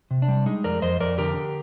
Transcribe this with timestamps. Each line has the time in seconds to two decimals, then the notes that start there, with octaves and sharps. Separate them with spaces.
0.11 C3
0.22 D4
0.28 G3
0.46 G#3 D#4
0.64 F2 A#4 D5
0.82 F2 C5 D#5
1.00 F2 A#4 D5
1.18 D3 G4 A#4
1.36 D3